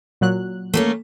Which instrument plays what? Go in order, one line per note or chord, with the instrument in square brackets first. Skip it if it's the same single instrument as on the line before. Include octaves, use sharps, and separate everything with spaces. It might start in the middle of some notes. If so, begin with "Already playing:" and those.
[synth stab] A#2 F#3 F#6
[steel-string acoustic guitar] A3 A#3 C#4